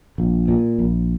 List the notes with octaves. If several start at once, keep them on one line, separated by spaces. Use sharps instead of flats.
A#1
A#2
A#1